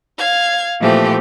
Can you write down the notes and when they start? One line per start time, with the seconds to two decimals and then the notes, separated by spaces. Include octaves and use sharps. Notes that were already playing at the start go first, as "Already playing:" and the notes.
0.18 F5 G#6
0.80 A#2 E3 F3 A3 C4 G4